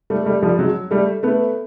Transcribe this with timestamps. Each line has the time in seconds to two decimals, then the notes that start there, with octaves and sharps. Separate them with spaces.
0.10 G3 A3
0.25 G3 A3
0.42 F3 G3
0.59 F#3 G#3
0.91 G3 A3
1.23 A3 B3